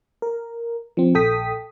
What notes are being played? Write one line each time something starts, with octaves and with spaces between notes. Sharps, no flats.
A#4
F3 C4
A#1 A4 G5 D#6 B6